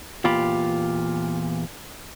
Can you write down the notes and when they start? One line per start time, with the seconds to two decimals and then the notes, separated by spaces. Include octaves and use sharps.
0.24 E2 A#2 F4 G4 B5